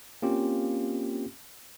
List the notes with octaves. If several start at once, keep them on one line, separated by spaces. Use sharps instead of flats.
A#3 C4 C#4 F4 G4